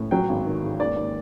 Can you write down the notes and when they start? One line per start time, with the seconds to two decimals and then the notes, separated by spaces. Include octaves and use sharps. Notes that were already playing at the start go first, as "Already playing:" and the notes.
Already playing: A2
0.11 F#3 G5
0.29 G#1
0.45 D#3
0.63 G#2
0.80 D#2 D5
0.96 D#2